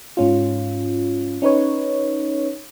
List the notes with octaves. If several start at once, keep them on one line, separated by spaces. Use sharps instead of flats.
G#2 C#4 F4
C#4 D#4 B4 C#5